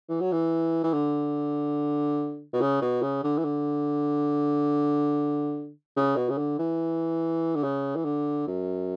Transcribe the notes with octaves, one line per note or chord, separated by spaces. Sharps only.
E3
F#3
E3
E3
D3
B2
C#3
B2
C#3
D3
E3
D3
C#3
B2
C#3
D3
E3
D3
C#3
E3
D3
F#2